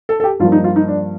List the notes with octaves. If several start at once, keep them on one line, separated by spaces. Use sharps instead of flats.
A4
A4
G4
G2 F3 A#3 F4
D#4
F4
D#4
D4